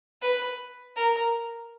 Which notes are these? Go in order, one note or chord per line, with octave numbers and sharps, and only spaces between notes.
B4
A#4